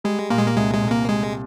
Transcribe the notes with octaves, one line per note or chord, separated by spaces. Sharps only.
G3 G#3
A#2 A#3
G#3
A#3
C2 G#3
G#3
C2
A#3
G3 G#3